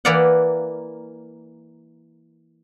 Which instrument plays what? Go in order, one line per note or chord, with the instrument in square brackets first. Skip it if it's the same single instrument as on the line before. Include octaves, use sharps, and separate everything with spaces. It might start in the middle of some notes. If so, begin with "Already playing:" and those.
[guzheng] E3 A#3 B4 D5 F5 F#5